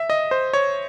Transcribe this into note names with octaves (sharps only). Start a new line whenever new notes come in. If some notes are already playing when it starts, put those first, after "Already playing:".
Already playing: E5
D#5
C5
C#5